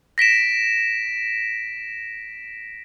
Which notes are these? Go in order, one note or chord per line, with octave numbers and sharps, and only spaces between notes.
A#6 B6 D7 E7